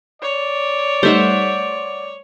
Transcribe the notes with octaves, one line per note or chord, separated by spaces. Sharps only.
C#5 D5
G3 A3 D#4 C5 E5 F#5